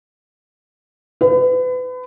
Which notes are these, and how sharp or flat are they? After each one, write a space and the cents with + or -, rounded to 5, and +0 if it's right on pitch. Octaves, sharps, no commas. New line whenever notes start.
B4 +35